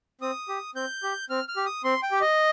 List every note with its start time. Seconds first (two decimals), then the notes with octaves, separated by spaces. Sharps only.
0.21 C4 D#6
0.48 G4
0.75 C4 G6
1.03 G4
1.30 C4 F6
1.48 F6
1.56 G4
1.66 D#6
1.84 C4 C6
2.03 G5
2.11 G4
2.21 D#5